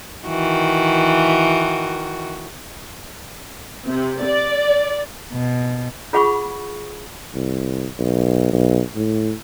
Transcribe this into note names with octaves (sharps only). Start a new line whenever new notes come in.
D#3 E3 F#4
C3
D5
B2
F4 G#4 F#5 B5 C#6
C2
B1
B1
A2